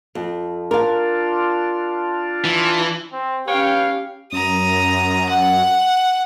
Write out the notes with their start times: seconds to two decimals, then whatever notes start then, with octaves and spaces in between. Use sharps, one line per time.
0.15 F2
0.71 D4 F4 A#4 F5
2.45 E3
3.12 C4
3.48 C#4 G4 B4 C#5 F5 G5
4.33 F#2 A#5 D#6
5.29 F#5